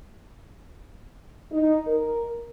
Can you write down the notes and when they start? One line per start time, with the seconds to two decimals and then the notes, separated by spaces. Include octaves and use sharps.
1.52 D#4
1.88 A#4